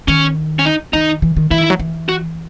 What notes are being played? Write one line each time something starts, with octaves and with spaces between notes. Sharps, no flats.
D#3 C#4
C#4
D#4
D#3 D#4
E3
D#3
E3 E4
D#3
F#3
E3
F#4